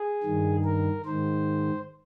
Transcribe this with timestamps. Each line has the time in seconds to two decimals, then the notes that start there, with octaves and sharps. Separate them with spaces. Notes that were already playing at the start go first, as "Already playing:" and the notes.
Already playing: G#4
0.23 G2 D#3
0.64 A#4
1.05 G#2 D#3 C5